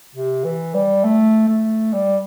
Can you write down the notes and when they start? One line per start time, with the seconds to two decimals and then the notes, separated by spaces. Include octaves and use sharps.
0.15 C3
0.44 E3
0.74 G3
1.04 A3
1.48 A3
1.93 G3